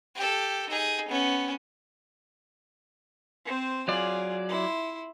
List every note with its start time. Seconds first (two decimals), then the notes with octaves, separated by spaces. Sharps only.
0.16 G4 A4
0.69 D#4 G#4
1.08 B3 C#4
3.45 C4 C5
3.88 F#3 F4 G#4 D5
4.49 E4 C6